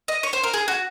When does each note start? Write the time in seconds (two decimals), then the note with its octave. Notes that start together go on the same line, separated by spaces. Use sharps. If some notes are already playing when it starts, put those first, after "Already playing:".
0.08 D#5
0.23 C#5
0.33 C5
0.43 A#4
0.54 G#4
0.68 F#4